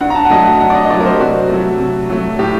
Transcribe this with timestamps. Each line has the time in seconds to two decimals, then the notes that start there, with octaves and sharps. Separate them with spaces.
0.01 G2 F#5
0.10 A#5
0.15 A5
0.25 F#5
0.30 F#3 A3 D#5
0.46 F#5
0.60 G2 F#5
0.70 D5
0.75 D#5
0.85 D#5
0.90 F#3 A3 D5
1.00 A#4
1.05 C5
1.14 G4
1.20 C3 F#4
1.49 F#3 A3
1.79 C3
2.10 F#3 A3
2.39 A2 G4